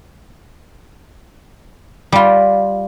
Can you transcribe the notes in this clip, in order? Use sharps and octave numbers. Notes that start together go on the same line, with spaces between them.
G3 F4